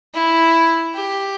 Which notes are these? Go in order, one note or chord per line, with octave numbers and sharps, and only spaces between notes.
E4
G4